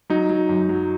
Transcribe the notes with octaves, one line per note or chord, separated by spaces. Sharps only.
F#3 D#4
F#3
F#2
F#3